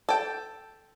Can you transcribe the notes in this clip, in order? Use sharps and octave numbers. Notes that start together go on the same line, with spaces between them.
A4 G5